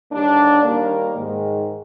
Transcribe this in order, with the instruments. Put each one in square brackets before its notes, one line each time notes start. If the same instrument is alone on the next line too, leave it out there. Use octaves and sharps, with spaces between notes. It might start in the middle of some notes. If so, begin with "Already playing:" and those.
[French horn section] D#2 D3 G3 A#3 D4
D#2 D#3 G3 A#3
G#2 D#3 G#3